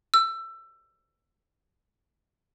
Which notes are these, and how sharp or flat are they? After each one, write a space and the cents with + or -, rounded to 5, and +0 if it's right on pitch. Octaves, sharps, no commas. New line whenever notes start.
E6 +20